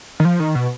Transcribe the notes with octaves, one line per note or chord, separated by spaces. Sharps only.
D#3
F3
D#3
B2